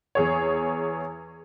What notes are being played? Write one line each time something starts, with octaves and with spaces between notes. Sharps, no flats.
E2 G#4 C#5